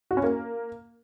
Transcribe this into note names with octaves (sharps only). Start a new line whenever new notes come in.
F#4
C#4
A#3